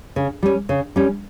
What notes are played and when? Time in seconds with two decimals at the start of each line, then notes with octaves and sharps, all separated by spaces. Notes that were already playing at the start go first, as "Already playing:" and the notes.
0.16 C#3
0.43 G3 C#4
0.69 C#3
0.96 G3 C#4